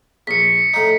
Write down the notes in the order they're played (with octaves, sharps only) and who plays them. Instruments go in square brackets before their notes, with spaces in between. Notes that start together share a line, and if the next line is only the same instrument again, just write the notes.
[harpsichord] A#1 [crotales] B6 C#7
[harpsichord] A2 D#4